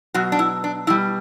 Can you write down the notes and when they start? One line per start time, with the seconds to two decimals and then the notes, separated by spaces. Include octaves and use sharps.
0.14 B2 F#3 F#4
0.32 D4
0.39 E4
0.64 D4
0.87 B2 G3 E4